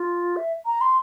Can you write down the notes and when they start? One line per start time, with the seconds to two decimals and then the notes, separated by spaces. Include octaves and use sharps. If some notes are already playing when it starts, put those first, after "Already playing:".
Already playing: F4
0.36 E5
0.66 A#5
0.81 C6